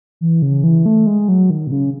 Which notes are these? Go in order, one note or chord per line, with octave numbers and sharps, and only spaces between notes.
E3
C#3
E3
A3
G#3
F#3
D#3
B2
C#3